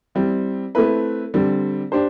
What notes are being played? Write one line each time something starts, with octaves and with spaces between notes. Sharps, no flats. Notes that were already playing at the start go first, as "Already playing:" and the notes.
G3 C4 E4
A3 C4 E4 B4
D3 G3 C4
D4 G4 C5